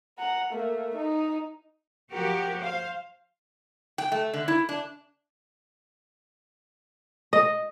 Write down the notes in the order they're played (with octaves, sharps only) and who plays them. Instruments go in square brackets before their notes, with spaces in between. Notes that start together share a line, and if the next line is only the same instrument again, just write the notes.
[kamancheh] F#5 A#5
A3 A#3
D#4
[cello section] F3 F#4 G4 A#4
C5 F5
[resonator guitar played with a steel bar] G5
A3
D3
E4
D4
[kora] D#5